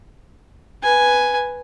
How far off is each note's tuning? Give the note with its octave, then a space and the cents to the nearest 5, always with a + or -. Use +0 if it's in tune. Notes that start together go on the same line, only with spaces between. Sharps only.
B4 +0 G#5 +0